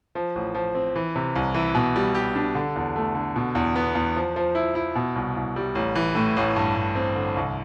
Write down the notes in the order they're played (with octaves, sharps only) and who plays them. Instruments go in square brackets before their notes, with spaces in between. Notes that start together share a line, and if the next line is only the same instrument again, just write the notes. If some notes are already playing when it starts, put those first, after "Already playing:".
[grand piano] F3
A1
F3
C4
E3
C3
C2
E3
B2
G3
G4
D4
D3
E2
A3
D3
B2
E2
B3
E2
F3
F3
E4
E4
B2
C2
C2
G3
A1
E3
A2
A1
G2
G2
C4
D3
C2